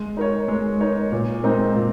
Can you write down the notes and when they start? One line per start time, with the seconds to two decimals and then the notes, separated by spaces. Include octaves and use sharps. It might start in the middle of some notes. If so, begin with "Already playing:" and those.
Already playing: G#3
0.17 D#4 A#4 C#5
0.48 G#3
0.80 D#4 A#4 C#5
1.12 A#2
1.44 G#3 C4 D#4 A#4
1.75 A#2